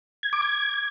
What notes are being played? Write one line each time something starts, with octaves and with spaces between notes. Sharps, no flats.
G#6
D6
G#6